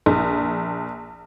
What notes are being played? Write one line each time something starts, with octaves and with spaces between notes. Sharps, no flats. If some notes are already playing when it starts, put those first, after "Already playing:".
A#1